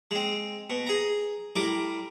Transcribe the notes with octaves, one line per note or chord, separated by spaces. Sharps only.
G#3 C4
B2
G#4 A#5
A2 G3 A#4 D6